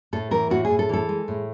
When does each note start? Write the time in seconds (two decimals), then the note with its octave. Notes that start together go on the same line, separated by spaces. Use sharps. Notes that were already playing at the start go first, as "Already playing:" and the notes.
0.13 A2 A4
0.31 E3 A#4
0.50 A2 F#4
0.65 G#4
0.70 A2
0.79 A4
0.89 E3 A4
1.09 G#3
1.28 A2